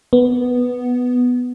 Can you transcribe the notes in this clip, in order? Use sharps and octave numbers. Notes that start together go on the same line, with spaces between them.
B3